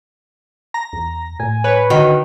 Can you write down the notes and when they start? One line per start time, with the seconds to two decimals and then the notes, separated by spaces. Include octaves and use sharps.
0.74 A#5 A#6
0.93 E2
1.40 A2 G#5
1.64 B4 C#5
1.90 D3 D#3 F#4